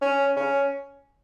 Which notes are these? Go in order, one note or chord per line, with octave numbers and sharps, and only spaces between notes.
C#4
C#4